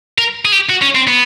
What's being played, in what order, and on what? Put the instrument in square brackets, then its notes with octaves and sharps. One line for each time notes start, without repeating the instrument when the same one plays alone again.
[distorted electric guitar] A#4
G#4
G4
F#4
C#4
C4
B3